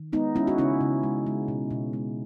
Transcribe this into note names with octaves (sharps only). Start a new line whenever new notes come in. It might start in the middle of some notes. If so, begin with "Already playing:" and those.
Already playing: D#3
G#3 B3 D#4
G#3 C#4 E4
F#4
C#3 C#4 E4
C#3
G#3
G#3
B2
B2
G#3